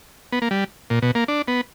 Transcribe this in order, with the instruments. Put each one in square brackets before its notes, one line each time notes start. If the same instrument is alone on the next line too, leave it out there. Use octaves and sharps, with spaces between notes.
[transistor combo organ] B3
A#3
G3
A#2
B2
A#3
D4
B3